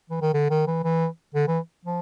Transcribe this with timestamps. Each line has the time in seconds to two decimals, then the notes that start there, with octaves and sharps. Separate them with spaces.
0.10 E3
0.22 D#3
0.34 D3
0.50 D#3
0.67 E3
0.84 E3
1.34 D3
1.47 E3
1.85 F3